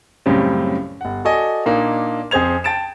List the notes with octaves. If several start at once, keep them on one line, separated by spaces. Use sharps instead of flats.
F#2 A2 C#3 G3 C4
G1 F#5
F#4 A4 D5 D#5 G#5
A#2 A#3 D4 D#4
F2 G#4 C5 G#6 F7
G5 A5 A6 D7 E7